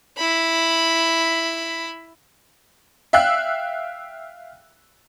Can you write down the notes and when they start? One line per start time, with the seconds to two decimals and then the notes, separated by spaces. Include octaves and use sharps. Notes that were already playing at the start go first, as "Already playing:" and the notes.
0.18 E4 B5
3.13 E5 F5 G5 E6 F#6